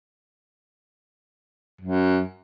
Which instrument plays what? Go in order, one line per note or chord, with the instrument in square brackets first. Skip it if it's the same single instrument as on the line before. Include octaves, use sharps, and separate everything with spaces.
[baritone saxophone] F#2